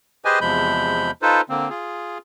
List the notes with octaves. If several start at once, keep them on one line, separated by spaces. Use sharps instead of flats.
G4 G#4 B4 C5 D#5 G#5
E2 C3 F3 G#3 B5 G6
D#4 F4 A4 B4 C5
D3 A#3 C4
F4 G#4